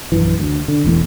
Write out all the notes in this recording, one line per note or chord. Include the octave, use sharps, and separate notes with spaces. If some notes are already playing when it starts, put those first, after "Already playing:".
A#1 F#2 E3
D2
D3
E1 A1 E2 A2